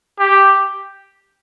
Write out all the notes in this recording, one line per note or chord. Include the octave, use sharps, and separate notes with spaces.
G4